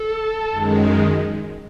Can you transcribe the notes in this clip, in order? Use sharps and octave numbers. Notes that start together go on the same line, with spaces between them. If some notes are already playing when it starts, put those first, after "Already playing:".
Already playing: A4
F#2 D#3 G#3